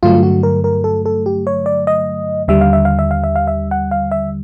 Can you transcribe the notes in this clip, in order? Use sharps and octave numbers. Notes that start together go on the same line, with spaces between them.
G2 D3 F#3 A3 F4
F#4
A#4
A#4
A4
A4
G4
C#5
D5
D#5
D#2 D3 G3 E5
F5
E5
F5
E5
F5
E5
F5
E5
F#5
F5
E5